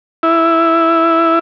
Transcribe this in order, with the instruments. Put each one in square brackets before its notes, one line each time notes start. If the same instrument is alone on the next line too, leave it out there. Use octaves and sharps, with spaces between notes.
[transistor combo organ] E4